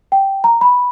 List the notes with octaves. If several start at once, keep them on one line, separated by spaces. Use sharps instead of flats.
G5
A#5
B5